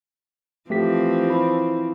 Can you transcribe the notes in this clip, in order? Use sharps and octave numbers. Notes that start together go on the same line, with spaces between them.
E3 F3 A3 C4 G4 B6
E4 B5